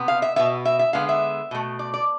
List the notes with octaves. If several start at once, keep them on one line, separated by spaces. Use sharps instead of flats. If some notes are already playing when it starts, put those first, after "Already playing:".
Already playing: C3 B3
F5
E5
B2 B3 E5
E5
E5
D3 G#3 B3 F5
E5
B2 A3
D5
D5